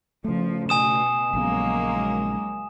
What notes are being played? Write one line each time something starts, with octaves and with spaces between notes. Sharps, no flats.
C#3 F3 A3
B2 G#5 D#6 E7
A#1 C#3 F#3 G#3 A#3 B3